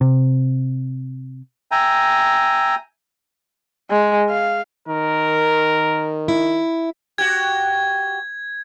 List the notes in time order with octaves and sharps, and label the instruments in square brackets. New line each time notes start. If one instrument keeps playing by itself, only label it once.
[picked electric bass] C3
[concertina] E5 G5 G#5 A#5
[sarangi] G#3
F5
[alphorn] D#3 [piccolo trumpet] A#4
[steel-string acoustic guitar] E4
[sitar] F#4 G4 [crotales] G#6